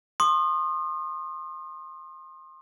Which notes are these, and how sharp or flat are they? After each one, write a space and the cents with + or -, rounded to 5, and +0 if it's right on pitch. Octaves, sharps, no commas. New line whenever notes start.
C6 +30 D#6 -30